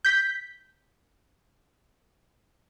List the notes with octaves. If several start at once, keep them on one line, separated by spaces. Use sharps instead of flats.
G6 B6